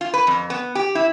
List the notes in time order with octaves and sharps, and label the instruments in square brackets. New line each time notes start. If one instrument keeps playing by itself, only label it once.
[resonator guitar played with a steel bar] F4
B4
F2
B3
G4
E4